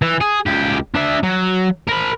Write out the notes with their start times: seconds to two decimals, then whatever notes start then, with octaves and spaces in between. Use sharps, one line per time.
0.02 E3
0.21 G#4
0.46 C#2 G4
0.94 D4 E5
1.23 F#3
1.88 A#4 B5